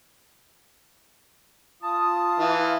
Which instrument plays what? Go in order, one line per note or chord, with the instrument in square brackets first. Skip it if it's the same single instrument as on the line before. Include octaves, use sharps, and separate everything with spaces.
[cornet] F4 [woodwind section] A5 D#6
[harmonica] E3 [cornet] F5